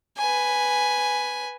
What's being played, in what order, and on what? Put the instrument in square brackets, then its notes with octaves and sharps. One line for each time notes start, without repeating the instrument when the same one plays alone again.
[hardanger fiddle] B4 G#5